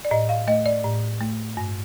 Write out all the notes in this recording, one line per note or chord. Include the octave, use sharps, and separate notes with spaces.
D5
A2 D#5
F5
A3 D#5
D5
A2
A3
G2